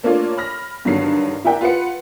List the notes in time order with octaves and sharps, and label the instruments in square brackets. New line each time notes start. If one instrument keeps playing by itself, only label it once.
[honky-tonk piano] A3 A#3 D4 F4 C#5 D5
B5 F6 A#6
G2 D3 D#3 F#3 C7
E4 A#4 D5 E5 F#5 G5
F4 B4 F#5 C#7